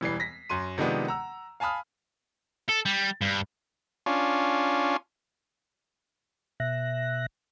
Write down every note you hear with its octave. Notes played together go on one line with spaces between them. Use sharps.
E1 E3 G3 C7
A#6 B6
F#2 F#3 C6 D#7
C3 D#3 F3 G#3 B3 D4
F#5 A#5 E6
F5 G#5 A5 B5 D#6 F6
A4
G3
G2
C#4 D4 F4
B2 E5 F#6 A#6